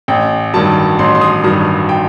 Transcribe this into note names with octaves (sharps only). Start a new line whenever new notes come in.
A1 G5
G2 D#3 F#3 A5
A1 C6
C6
D#6
G2 D#3 F#3 D#6
G5